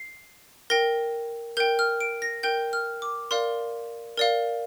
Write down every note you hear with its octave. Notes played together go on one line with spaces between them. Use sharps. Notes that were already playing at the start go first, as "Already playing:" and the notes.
Already playing: C7
A#4 G5 A#6
A#4 G5 G6
F6
D7
A#6
A#4 G5 G6
F6
D6
A#4 D5 F5 C6
A#4 D5 F5